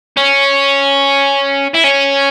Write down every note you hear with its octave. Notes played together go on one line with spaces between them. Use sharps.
C#4
E4
C#4